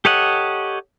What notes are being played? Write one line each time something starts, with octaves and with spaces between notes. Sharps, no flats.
G4 A4 C#5 D#5 F#5